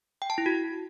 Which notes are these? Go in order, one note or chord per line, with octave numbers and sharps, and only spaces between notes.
G5
A5
E4
F#4